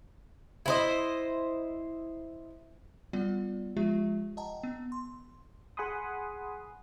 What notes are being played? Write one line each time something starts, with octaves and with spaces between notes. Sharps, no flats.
E4 C5 D#5
G3 B3 F4 D5 F#5
F3 G#3 F4 G4 E5
D#5 F#5 G5 A5 A#5
B3
C6
G#4 F#5 G#5 B5 C6 D#6